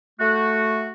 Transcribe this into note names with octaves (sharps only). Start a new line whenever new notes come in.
A3 F#4